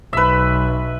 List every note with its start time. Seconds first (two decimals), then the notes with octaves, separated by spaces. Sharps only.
0.13 B1 B4 E5